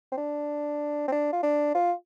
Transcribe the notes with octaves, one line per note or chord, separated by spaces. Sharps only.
C4
D4
C4
D4
F4
D4
F4